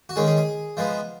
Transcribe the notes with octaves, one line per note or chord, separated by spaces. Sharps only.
F#4
D#3 G#3 C#4 G#4
G#4
G#4
F3 G#3 B3